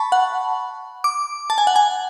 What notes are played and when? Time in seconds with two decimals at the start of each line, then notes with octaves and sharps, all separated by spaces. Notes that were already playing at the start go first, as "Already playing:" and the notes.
Already playing: A5 B5 C#6
0.12 F#5
1.04 D6
1.50 A5
1.58 G#5
1.67 F#5
1.76 G#5